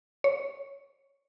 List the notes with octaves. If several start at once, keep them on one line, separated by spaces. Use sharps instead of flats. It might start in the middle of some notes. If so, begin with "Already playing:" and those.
C#5